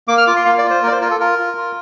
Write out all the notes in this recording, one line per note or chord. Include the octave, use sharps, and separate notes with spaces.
A#3 D6
F6
F4 D6
C6
A#3 F5
D5
F4
C5
A#3 A#4 D5
C5
F4 A#4
A4
F4 A#4
F4
F4